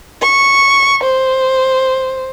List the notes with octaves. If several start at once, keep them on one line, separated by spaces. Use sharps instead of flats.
C#6
C5